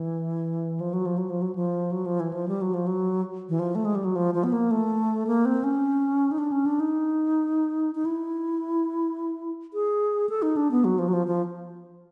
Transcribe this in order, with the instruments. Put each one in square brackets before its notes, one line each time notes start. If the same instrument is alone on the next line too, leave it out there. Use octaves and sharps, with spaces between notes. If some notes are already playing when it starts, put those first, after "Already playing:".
Already playing: [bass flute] E3
F3
F#3
F3
F#3
F3
F#3
F3
F#3
F3
E3
F3
G3
F#3
F3
F#3
E3
F3
A3
G#3
G3
F#3
F3
F3
B3
A#3
A3
A#3
C4
C#4
D#4
D4
C#4
D4
D#4
D#4
E4
G#4
A4
D#4
D4
B3
F#3
F3
F#3
F3
F3